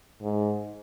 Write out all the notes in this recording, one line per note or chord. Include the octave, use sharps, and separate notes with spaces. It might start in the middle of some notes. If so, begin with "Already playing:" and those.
G#2